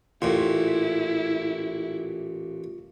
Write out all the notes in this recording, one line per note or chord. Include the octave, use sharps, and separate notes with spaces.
A1 A#2 E4 F4